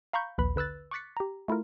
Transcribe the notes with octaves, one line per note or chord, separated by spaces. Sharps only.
F5 A#5 B5 C#6 G6
A#1 D#2 B4 B5
D3 B4 E6 F#6 A6
C#6 D6 F#6 A6 B6 C#7
G4 A#5
A3 E4 F4 A#4